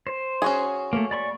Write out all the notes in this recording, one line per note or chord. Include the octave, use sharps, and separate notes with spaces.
C5
C#4 F#4 G#4
A3 A#3
D5 B5 C#6